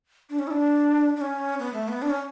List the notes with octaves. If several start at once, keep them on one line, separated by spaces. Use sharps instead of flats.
D4
C#4
E4
D4
D4
C#4
B3
A3
B3
D4
C#4